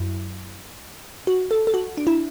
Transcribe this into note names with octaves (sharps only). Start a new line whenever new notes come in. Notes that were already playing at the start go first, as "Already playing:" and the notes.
Already playing: F#2 F#3 E4
F#4
A4
A4
F#4
D4
E4